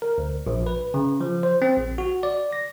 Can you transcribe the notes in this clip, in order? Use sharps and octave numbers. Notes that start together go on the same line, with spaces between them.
A#4
D2
A#1
B4
C#3
F3
C5
C4
A#1
F#4
D5
A#6